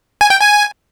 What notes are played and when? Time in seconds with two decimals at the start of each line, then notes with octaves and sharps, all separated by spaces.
0.21 G#5
0.30 G5
0.41 G#5